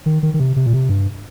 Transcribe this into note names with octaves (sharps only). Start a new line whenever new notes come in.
D#3
D#3
D#3
C3
C3
A#2
C3
G2